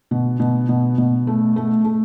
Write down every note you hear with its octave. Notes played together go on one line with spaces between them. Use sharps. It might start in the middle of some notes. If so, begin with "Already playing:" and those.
B2
B2
B2
B2
A3
A3
A3